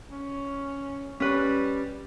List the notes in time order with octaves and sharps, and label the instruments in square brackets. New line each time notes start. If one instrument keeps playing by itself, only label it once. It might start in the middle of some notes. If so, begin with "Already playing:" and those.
[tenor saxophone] C#4
[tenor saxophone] G3 [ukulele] C#4 B4